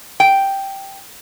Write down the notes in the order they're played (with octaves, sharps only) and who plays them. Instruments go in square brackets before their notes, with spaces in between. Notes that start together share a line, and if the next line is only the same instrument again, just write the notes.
[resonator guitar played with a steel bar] G5